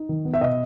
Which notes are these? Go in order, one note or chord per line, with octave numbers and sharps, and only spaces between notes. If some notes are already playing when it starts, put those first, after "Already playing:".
Already playing: D#4
D#3
B3
E5
B2 D#5